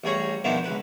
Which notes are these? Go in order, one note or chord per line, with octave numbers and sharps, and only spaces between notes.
A1 G3 G#4 C#5 A#5
D#3 F3 B3 D4 E4
C#2 B4